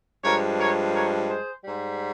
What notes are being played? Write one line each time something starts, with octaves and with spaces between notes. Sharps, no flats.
G2 F3 G#3 A#4 C#5
A#4 C#5
A#4 C#5
G#4 C5
G#2 G3